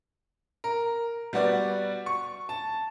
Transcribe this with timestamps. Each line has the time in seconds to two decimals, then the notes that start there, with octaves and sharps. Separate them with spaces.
0.64 A#4
1.33 G3 B3 F#4 D5
2.06 C#6
2.49 A5